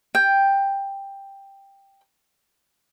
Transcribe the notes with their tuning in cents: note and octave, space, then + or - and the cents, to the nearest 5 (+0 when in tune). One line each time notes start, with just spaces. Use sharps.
G5 +10